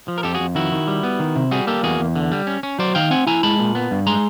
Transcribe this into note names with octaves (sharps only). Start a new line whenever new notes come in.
F3
A#4
F2 G4 A4
F#4 G#4
F2
D#3 E4 F#4
D#3
G3
B3
D#3
C3
G3 F#4 G#4
A#3 G4 A4
E2 F#4 G#4
E2
D3
G3
C#4
C#4
F#3 C5 D5
D#3 F5 G5
C4 F#5 G#5
E4 G#5 A#5
G#3 A5 B5
A#2
B3
G2
G#3 A#5 C6